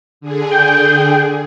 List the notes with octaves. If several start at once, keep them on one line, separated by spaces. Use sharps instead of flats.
D3 G#4
G5